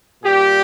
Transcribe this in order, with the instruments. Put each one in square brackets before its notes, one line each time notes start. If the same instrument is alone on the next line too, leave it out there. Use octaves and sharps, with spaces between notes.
[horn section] A#2 G3 G4